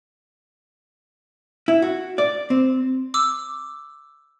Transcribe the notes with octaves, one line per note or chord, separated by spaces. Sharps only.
E4
F#4
D5
C4
D6 E6